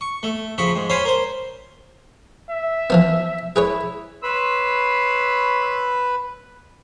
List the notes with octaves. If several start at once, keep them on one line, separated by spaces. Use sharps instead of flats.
C#6
A3
C#3 F3 B5 C#6
G#2
C5 C#5 F5 G#5 B5 C6
A#4 C5
E5
E3 F3 B3
E4 G#4 B4 C#5
B4 C#5 B5 C6 E6